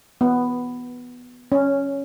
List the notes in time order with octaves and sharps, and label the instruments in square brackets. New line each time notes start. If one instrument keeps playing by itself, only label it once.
[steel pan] B3
C#4